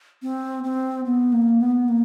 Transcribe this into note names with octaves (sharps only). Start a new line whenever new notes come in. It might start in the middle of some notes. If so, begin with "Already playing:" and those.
C4
C4
B3
A#3
B3
A#3